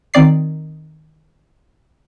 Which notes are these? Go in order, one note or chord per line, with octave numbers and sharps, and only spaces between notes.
D#3 C4 D5 C7